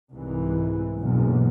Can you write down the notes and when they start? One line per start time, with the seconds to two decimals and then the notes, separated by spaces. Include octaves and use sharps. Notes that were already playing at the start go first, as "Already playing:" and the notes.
0.13 C2 G#2 E3
0.99 F#1 B1 E2 G2